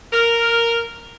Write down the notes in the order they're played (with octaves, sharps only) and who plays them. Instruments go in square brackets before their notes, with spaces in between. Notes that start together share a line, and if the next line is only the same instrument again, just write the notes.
[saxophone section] A#4